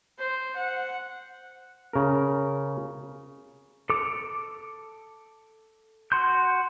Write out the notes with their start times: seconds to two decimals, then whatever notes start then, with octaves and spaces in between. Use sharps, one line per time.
0.18 C5
0.56 F#5
1.93 C#3 A#4
3.90 A4 D6
6.12 F#4 C6 G6